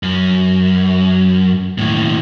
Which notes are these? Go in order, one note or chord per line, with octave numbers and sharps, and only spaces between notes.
F#2
D#2 A2